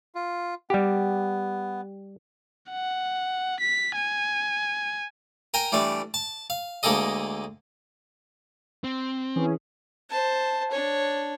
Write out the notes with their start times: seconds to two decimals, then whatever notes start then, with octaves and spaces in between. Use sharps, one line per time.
0.15 F4
0.70 G3 B3 G4
2.70 F#5
3.60 B6
3.96 G#5
5.54 A#4 G5 G#5 A#5
5.72 E3 G3 A3 D4
6.14 A5
6.50 F5
6.83 D2 G#3 A#3 G#4 A4 D#5
8.84 C4
9.36 E3 C#4 G#4
10.10 C5 A5
10.71 D4 C#5